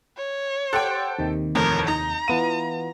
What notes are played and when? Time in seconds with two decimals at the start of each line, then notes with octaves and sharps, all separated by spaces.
0.17 C#5
0.73 G4 A4 C5 F#5 G5
1.19 D#2 C3 D#3
1.55 A1 F2 A2 A#4
1.88 D#4 A#5
2.28 E3 B3 F4 D#7